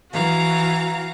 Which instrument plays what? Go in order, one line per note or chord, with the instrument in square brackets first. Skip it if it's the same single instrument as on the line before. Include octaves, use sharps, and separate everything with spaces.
[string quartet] E3 F#4 F5 A#5